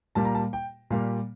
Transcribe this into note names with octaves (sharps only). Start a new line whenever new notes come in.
A#2 G3 A#3 A5
A#5
A5
G5
A#2 G3 A#3 F5